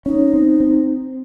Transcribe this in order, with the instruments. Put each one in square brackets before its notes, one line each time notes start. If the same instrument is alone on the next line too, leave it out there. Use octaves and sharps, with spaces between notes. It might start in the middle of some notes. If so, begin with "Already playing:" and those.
[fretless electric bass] C#4 [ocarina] D#4
[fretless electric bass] C4
C4